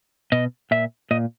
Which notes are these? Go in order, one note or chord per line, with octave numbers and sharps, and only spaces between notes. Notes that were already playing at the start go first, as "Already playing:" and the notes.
B2 D#5
A#2 E5
A#2 D#5